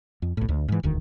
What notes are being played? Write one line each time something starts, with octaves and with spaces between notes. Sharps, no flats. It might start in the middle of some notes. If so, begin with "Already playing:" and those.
F2
B1 A2
D2
G#2 E3
E1 D2 D#3